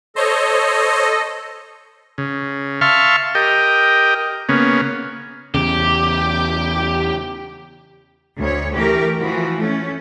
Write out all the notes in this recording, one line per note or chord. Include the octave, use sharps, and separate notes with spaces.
A4 C5 C#5 D#5
C#3
E5 F5 A5 C6 C#6 F6
G4 A#4 D#5 G5
C#3 A#3 B3 C#4
E2 C#3 G4
D2 C#5
E3 A3 G4 A#4
E3 F3 F#4
A3 C#4